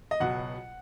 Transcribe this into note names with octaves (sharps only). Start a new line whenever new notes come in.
D#5
C#2 B2 F#3 F#5